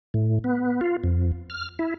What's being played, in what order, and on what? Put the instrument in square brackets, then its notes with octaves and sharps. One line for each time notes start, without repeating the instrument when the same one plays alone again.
[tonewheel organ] A2
B3
F4
F2
F6
E4